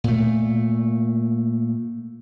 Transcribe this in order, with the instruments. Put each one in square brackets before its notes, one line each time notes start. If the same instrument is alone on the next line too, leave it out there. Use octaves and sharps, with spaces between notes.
[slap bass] A#2 A3